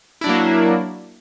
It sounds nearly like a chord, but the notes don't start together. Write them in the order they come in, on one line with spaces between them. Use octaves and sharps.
E4 D4 F#3 A#3